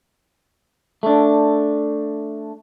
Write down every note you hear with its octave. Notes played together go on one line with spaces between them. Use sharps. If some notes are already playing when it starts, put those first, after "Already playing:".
A3 D4